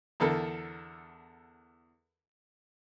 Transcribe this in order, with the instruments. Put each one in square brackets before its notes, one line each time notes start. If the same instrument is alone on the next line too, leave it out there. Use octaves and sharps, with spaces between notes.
[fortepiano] E2 D3 A4 A#4